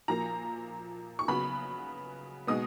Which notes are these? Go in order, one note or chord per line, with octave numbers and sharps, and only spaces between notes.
A#2 F3 A#3 A#5
C#6
C#3 F#3 B3 B5
B2 G#3 B3 D#6